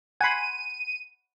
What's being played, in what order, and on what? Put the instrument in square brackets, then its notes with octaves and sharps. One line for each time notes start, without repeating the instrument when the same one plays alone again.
[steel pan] F#5 B5 [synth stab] G#5 C6 [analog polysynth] D#7